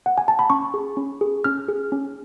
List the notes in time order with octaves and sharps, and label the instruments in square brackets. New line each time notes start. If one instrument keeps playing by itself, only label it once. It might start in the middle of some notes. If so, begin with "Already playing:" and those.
[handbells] F#5
G#5
A5
B5
C#4 C#6
G#4
C#4
G#4
C#4 F6
G#4
C#4